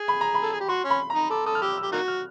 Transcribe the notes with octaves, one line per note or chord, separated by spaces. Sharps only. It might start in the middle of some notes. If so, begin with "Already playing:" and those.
Already playing: G#4
B5
A#5
B5
A4
G#4
G4
F#4 C6
C#4
B5
A#5
D#4
A4 D6
A4 D#6
F6
G4 E6
E6
G4
A#3 D#4 F#4 F#6
F6